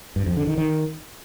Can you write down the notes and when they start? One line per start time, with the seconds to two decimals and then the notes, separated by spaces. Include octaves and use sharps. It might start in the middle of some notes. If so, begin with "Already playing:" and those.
0.16 G2
0.26 F2
0.37 D3
0.47 D#3
0.58 D#3